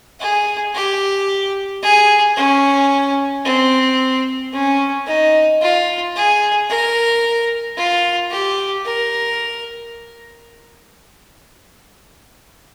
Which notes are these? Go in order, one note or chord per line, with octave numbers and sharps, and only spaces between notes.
G#4
G4
G#4
C#4
C4
C#4
D#4
F4
G#4
A#4
F4
G4
A#4